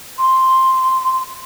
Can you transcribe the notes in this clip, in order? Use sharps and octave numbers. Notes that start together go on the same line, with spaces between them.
C6